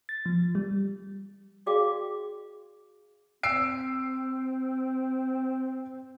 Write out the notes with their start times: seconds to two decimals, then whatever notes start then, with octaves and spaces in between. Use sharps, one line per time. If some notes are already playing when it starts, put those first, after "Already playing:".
0.09 A6
0.26 F3
0.55 G3
1.66 F#4 G#4 D5 F5 G5 D6
3.43 C4 E6 C7 D7